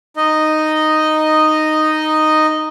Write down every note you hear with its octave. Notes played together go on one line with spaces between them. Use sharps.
D#4 D#5